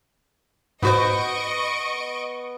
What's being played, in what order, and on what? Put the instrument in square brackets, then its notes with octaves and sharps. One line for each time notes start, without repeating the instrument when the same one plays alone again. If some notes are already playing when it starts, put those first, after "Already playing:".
[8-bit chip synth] G#2 F#4 C5 [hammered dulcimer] B3 [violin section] D#5 C#6 D7